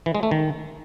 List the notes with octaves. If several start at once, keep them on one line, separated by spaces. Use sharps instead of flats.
E3
G#3
A3
D#3